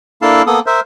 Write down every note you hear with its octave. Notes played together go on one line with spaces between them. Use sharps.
A#3 D4 E4 A4 F5 A5
A#3 B3 A4 D#6
A#4 C5 E5